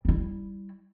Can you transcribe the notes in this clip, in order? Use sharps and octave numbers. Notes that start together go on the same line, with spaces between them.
G3 E4